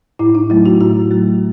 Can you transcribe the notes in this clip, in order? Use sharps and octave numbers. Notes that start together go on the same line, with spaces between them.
A2 E4
D#4
F#3 A3 E4
F#4
A2 F#4
F#3 A3